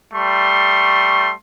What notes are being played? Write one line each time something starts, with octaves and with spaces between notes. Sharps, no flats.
G3 A3 C6 C#6